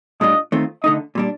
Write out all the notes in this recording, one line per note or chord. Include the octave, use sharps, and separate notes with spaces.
A2 G3 D4 F4 D#5
D#3 A3 C4 F4
D3 A3 D#4 D#5
A#2 G3 D4